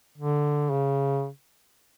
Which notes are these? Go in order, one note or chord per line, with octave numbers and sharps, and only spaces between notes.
D3
C#3